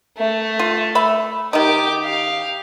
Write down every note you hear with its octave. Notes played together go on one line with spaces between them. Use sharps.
A3
F4
E5 B5
D#3 D#4 G4 D6
G4 F5